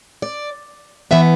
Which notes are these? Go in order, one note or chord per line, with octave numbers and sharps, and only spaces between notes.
D5
E3 B3 E5